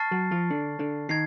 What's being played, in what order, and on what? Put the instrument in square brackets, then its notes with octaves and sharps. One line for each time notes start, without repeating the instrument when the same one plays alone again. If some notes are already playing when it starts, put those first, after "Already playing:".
Already playing: [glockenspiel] A5 C#6 F6 A6 C7
[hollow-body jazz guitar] F#3 F#4
F3 F4
D3 D4
D3 D4
[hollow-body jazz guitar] D#3 D#4 [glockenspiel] G#6 C7